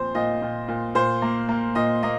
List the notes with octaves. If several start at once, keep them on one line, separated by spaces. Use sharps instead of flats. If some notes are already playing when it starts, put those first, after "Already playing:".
Already playing: A#2 F3 C4 C5
A#2 D#5
A#2
A#2
A#2 C5
A#3
A#3
A#2 D#5
A#3 D#5